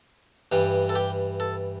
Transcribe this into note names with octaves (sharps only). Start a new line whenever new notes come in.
G2 E3 G3
A4
G4
A4